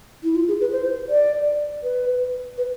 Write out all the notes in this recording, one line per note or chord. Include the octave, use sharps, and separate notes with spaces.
E4
F4
G#4
B4
C5
D5
B4
B4